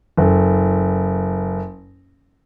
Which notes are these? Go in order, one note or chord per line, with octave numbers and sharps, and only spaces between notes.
F#1 A4